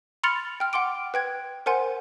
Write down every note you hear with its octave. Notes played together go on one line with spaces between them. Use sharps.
B5 C6 F6 A6 C#7 F7
G5 F6
F#5 G5 C6 D6 D7
B4 G5 G#6
A#4 C5 F#5 G#5 C6